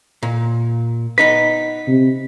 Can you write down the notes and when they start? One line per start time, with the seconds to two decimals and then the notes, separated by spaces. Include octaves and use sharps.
0.23 A#2
1.18 B3 D#4 B4 B6
1.88 C3